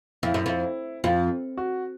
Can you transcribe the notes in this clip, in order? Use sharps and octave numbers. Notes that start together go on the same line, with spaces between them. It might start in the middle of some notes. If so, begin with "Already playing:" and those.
F2 E4
F#2
F2
F2 F4
F#4